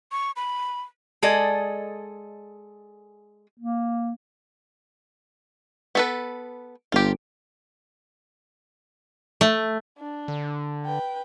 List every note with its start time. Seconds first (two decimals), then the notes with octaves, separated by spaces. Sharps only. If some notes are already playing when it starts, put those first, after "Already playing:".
0.12 C#6
0.36 B5
1.22 G#3 G#4 A4 D5 D#5
3.59 A#3
5.95 B3 A4 B4
6.92 G1 F4 G4
9.41 A3
9.98 D4
10.28 D3
10.86 B4 G5